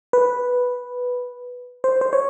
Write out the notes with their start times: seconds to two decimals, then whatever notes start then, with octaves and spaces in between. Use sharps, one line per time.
0.13 B4
1.84 C5
2.01 C5
2.13 C#5